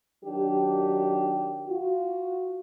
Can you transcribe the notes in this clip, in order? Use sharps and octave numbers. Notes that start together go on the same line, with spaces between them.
D#3 F#3 D4 G4
F4 F#4